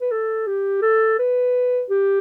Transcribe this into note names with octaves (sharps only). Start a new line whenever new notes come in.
B4
A4
G4
A4
B4
G4